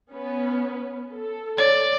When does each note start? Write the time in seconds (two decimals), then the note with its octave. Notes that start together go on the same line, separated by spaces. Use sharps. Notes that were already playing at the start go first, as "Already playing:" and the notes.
0.13 B3 C#4 B4
1.14 A4
1.58 C#5 D5